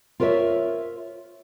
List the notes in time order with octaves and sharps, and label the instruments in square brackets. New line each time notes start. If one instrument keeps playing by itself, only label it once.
[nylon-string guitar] F4 A#4 C5 C#5 E5